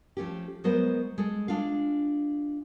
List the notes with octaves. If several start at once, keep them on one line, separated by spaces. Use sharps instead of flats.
F3 A3 C#4 G4
F#3 G#3 B3 A#4 C5 D#5
G#3 A4
G#3 D4 F4 F5